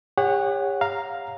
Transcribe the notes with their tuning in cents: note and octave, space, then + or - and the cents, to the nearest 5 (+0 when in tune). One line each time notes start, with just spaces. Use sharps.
G4 +40 C#5 +0 F#5 +0
F5 +0 A#5 +0